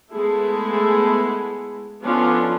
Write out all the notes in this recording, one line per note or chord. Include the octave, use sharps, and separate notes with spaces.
G#3 A3 B3 E4 G#4 A4
F3 B3 C#4 D4 F4 A4